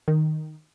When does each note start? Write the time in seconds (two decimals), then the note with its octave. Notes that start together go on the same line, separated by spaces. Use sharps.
0.08 D#3